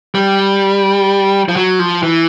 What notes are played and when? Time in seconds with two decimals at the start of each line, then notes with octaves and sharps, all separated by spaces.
0.15 G3
1.49 F3
1.56 F#3
1.79 F3
2.03 E3